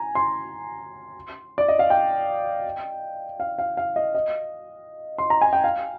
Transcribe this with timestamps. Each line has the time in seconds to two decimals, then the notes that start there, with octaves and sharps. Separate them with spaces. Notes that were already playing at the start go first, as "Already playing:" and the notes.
Already playing: G#5 A#5
0.15 C6
1.58 D5
1.68 D#5
1.79 F5
1.90 G5
3.40 F5
3.59 F5
3.77 F5
3.96 D#5
4.15 D#5
5.18 C6
5.30 A#5
5.41 G#5
5.53 G5
5.64 F5